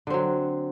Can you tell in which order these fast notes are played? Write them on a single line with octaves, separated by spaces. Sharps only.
D3 C4 F#3